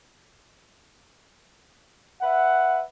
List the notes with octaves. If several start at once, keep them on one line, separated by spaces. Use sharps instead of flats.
B4 E5 F#5